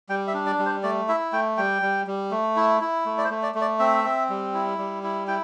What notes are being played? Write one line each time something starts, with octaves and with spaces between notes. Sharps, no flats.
G3 G5
E5
D4
D5
G3
C5
A3 D5
E4 E5
A3 G5
G3 G5
G3
G3
A3
E4
E4
A3
D5
C5
A3
D5
A3
D5
C4 E5
C4
G3
E4
G3
E4
E4 G5